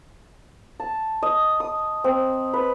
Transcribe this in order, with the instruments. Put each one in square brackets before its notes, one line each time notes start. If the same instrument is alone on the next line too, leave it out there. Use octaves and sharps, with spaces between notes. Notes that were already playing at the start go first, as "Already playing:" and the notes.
[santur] A5
D#5
D#6
C4
B4